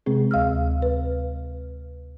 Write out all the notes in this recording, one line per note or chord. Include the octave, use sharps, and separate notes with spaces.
C3 G#3 C4 G#4
D2 F5 E6 F6
B4